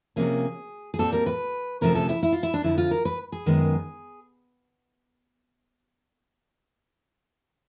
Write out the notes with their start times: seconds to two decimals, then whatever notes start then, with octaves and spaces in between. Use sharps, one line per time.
0.16 C3 F3 A#3 C#4 G#4
0.94 G#4
0.99 A#2 G3 C4 A4
1.13 A#4
1.26 B4
1.81 D2 C3 F3 A3 C#4 A#4
1.95 A4
2.09 E4
2.23 E4
2.32 F4
2.43 E4
2.54 D4
2.64 F2 D3 F3 E4
2.78 F4
2.91 A#4
3.05 B4
3.32 G#4
3.46 F#2 D#3 G#3 B3